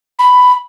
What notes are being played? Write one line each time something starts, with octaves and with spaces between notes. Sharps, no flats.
B5